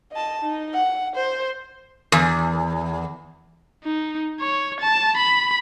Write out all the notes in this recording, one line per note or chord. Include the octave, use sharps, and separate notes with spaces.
D#5 A5
D#4
F#5
C5
E2
D#4
C#5
A5
B5